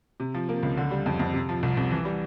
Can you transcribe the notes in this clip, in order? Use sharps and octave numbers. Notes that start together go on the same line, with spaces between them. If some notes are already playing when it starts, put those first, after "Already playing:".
C3
F3
A#3
C#2
D3
G3
F2
F2
C3
F3
C2
C2
E3
G3